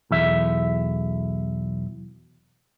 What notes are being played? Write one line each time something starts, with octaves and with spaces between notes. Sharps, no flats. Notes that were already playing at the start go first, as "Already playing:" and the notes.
B1 E2 E5